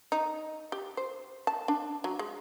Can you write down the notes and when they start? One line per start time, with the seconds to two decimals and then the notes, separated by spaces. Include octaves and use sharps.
0.12 D#4
0.72 G4
0.97 C5
1.47 A5
1.68 D4
2.04 F#3
2.19 G#3